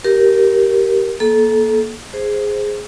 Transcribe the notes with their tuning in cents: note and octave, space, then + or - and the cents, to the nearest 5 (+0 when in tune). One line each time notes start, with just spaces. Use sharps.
G4 -15 A#4 +0
A#3 +20 A4 -25
G#4 +0 C5 +0